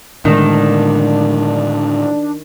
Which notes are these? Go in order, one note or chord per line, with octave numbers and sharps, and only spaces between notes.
A2 D3 D#3 G#3 D4